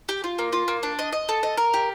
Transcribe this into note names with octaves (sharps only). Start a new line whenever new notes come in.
G4
F4
A#3
F4
A#3
D4
D#5
D#5
A4
D#5
A#4
G4